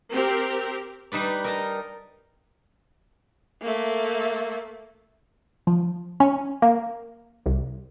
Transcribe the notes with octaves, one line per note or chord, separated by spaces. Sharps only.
C4 G4 A#4
G3 D#4 B4 D5
A#4 D#5 A5
A3 A#3
F3
C#4
A#3
C2